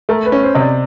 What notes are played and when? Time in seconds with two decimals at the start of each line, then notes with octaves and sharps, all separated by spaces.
0.09 A3 A#4
0.26 B4
0.32 C#4
0.43 C5
0.55 C3 D#5
0.61 D5